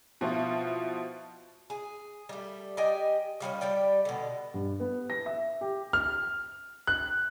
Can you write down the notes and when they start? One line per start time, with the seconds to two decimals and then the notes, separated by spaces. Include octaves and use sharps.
0.21 B2 F3 E4 F4
1.70 G#4
2.29 G3 A3
2.77 G4 D#5 G5 G#5
3.40 F3 G3 G#3 C#4
3.61 G3 G4 D5 G5
4.05 B2 D3
4.54 G2
4.80 B3
5.10 A#6
5.26 E5
5.61 G4
5.93 F6
6.87 F#6